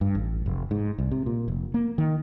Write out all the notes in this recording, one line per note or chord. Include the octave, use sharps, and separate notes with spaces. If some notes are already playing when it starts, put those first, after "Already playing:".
G2
A1
F1
G#2
C2
C3
A#2
F1
A#3
D#3